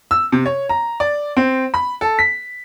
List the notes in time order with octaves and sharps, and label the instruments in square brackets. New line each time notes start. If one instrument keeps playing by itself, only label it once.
[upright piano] E6
C3
C#5
A#5
D5
C4
B5
A4
B6